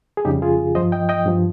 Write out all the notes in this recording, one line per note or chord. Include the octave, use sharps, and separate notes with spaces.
G#4
F2 C#3 G3 D#4 G4
F4 G#4
G2 F3 C5 D#5
D#5 G5
D#5 G5
G2 F3